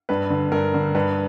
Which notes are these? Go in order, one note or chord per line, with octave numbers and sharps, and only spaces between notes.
G2 B4
D3
G2 A#4
D3
G2 B4